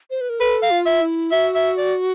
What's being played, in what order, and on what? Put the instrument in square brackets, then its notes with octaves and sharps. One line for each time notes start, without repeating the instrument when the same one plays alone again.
[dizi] C5
B4
A#4
[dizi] A4 [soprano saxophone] B4
[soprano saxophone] F5
[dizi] F4
[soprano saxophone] E5
[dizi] E4
[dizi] F#4 [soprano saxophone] E5
[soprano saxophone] E5
D5